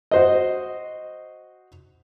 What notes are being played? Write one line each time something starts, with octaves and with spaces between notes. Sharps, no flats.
F#4 C5 D#5